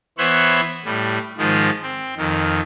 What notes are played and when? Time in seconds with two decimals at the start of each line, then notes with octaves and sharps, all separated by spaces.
0.18 E3 B3 C5 C#5 E5 F#6
0.85 A2 G3
1.38 G#2 D#3 F3 G#3
1.82 C4
2.17 F2 D#3